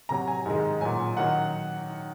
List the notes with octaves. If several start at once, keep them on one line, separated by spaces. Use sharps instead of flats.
C3 F#3 A#5
G#5
G#2 D#3 G#3
A#2 F#3 G#5
D#3 F#3 F#5